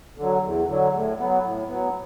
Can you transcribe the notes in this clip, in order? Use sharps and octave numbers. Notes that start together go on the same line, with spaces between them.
D3 F#3
E2
D3 F#3
A2
F#3 B3
A2
F#3 B3